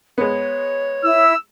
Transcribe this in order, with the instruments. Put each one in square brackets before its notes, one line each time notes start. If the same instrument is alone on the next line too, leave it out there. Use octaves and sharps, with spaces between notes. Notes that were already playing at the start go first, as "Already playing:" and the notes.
[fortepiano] G#3 B3 [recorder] C#5
[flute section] E4 [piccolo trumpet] E6